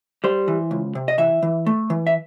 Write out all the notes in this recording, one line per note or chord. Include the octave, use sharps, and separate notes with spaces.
G3 C5
E3
C#2
C3
D#5
E3 E5
E3
A3
E3
E5